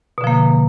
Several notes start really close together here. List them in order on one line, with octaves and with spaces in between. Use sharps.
B2 D3 F3 A#3